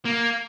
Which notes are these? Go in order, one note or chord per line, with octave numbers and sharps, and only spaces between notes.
A#3